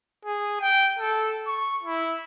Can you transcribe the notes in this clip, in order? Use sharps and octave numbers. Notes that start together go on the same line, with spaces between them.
G#4
G5
A4
C#6
E4